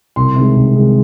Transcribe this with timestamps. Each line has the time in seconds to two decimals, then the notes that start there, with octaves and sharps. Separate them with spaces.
0.16 C2 C6
0.36 C3 D#3 G#3
0.56 C2
0.76 C3 D#3 G#3